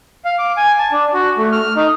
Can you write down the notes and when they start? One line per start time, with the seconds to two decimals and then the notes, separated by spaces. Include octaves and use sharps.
0.25 F5
0.39 D6
0.57 G#5
0.79 A5
0.92 D4
1.14 F#4
1.38 A3
1.52 F6
1.76 D#4